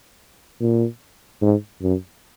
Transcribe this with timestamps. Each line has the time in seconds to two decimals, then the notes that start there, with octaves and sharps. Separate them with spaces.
0.60 A#2
1.42 G#2
1.82 F#2